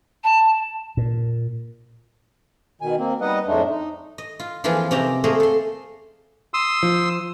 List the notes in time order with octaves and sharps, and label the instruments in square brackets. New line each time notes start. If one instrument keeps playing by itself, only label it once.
[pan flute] A5
[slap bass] A#2
[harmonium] B2 D#3 G#5
A#3 C4
G3 B3 D#4 B4 D#5 F#5
F2 A2 G#3 A3 D4 D#4
D#4
[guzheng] D#5
F4
E3 F3 A#3 C4 F4 G#4
C3 C4 C#4 D#4 G4 A#5
A3 A#3 G#4 A#4 C5 D#5
A4 C6
[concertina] C6 D#6 E6
[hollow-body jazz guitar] F3